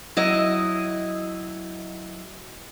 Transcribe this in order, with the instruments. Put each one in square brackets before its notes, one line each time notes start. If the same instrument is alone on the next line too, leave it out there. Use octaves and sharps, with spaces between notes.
[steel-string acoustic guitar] F#3 E4 D#5